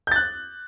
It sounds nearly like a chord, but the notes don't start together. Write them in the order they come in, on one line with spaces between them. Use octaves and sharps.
G6 A6 F#6